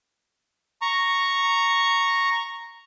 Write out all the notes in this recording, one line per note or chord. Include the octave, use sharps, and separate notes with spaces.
A#5 C#6